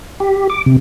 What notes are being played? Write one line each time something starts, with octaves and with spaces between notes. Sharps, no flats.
G4
D6
C3